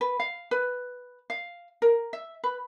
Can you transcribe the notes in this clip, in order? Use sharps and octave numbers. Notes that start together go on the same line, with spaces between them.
B4
F5
B4
F5
A#4
E5
B4